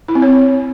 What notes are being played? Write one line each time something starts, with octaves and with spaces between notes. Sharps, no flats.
E4
C4
C#5